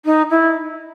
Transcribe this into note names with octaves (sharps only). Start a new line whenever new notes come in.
D#4
E4